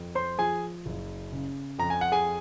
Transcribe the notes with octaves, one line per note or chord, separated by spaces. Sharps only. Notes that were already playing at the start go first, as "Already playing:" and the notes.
Already playing: F2
C5 C6
F3 G#4 G#5
F#1
C#3
F2 A#5
G#5
F#5
G#4 G#5